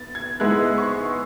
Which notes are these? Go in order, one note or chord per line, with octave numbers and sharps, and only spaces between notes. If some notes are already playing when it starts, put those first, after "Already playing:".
Already playing: B3 A6
G#6
G#2 G#3 B3 E4 F#6
C#6